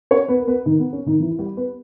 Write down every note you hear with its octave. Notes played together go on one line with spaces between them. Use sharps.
C#4 C#5
B3 B4
A#4
B3 B4
D#3 D#4
B3
C#4
D#3 D#4
E3 E4
E4
G3 G4
B3 B4